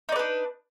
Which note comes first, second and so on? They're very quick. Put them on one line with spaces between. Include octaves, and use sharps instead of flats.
D#4 D5 B4 D4